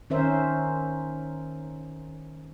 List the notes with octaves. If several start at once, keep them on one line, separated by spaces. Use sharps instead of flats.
D#3 C#4 A#4 C5 E5